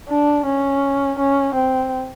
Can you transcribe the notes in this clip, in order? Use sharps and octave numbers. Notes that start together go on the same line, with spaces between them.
D4
C#4
C#4
C4